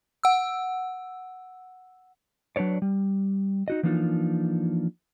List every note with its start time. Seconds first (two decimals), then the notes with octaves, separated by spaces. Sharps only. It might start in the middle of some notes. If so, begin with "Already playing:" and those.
0.24 F#5 E6
2.56 F#3 D4 B4 C#5 D5
2.82 G3
3.68 D#4 F#4 D#5
3.83 E3 F3 A#3 D4 D#4 F4